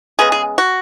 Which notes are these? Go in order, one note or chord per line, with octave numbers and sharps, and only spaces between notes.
C#3 G#3 B3 G#4
G#4
F#4